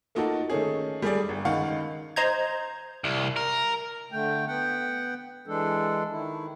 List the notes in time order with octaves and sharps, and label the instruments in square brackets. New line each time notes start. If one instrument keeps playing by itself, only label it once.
[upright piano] A3 A#3 D#4 F4 F#4 A4
D#3 A3 C#4 G#4
G3 A3 G#4 D5
G1
C#2 D#3 F5 F#5 C#6
[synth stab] C5 D#5 A#5 G6 G#6
[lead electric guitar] C2
A#4
[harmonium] D3 A3 G5
B3 F#5 G5
E3 G#3 D4 A4
D#3 E4